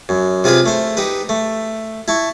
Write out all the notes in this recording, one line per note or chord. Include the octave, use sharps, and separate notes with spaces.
F#2
C3 F4 G#4 B4 F5
A3 C5
D#4 G4 B4
A3
E4 A5 C#6